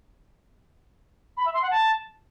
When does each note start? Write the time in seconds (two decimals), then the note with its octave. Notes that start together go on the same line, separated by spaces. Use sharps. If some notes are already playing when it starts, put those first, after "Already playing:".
1.37 B5
1.45 E5
1.54 C6
1.62 F#5
1.71 A5